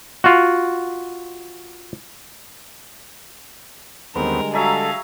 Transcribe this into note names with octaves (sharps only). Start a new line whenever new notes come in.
F4 F#4
D#2 D3 G3 G#3 B3 C4 A#4
F#3 G#4 A4 E5 F5 A#5